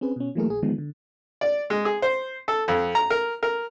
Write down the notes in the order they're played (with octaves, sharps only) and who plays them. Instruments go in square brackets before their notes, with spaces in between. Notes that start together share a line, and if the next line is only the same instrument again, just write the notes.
[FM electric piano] C4 C#4 G#4 B4
B2 C#4
E3 F#3 A3 A#3 G#4 A#4
A#1 G#4
D3 D#3 F3 G#3 B3
D3
[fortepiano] D5
G#3
G#4
C5
A4
F2
A#5
A#4
A#4